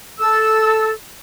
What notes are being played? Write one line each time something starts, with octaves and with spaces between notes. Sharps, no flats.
A4 E6